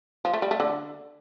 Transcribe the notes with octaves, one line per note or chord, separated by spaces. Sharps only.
F3
A3
G3
A3
D3